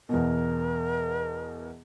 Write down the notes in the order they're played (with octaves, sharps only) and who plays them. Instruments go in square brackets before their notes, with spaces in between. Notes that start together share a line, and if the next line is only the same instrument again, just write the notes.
[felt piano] E2 B2 [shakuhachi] A#4